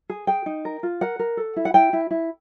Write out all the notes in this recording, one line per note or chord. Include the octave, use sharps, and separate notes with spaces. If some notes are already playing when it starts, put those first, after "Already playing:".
G#4
G#4 G5
D#4
A#4
F4
A#4 F#5
A#4
A4
E4
F#5
E4 G5
E4
E4